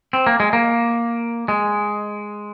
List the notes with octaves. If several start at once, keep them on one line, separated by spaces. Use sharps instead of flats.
C4
A#3
G#3
A#3
G#3